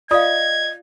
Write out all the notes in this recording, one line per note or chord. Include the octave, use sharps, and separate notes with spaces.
F4 D5 D#5 F5 D#6 G#6